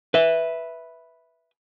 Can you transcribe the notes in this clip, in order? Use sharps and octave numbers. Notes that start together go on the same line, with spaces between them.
B4 E5